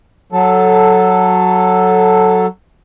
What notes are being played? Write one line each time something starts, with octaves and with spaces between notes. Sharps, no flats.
F#3 A4